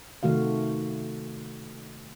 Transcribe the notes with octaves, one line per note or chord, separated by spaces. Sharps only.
C3 D#3 A3 F#4 F5